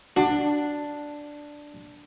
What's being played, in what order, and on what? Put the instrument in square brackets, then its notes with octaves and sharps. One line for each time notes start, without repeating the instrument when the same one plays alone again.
[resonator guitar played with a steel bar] D4 [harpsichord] F#4